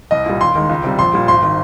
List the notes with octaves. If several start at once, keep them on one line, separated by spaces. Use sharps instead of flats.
C2 D#5
A#2 G3
D#2 C6
D#3 G#3
C#2
C3 G3
A#1 C6
A#2 G3
G#1 C6
D#3